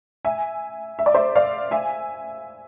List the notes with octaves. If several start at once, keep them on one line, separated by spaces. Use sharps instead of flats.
E5 G#5
E5
D5
C5 E5
D5 F5
E5 G#5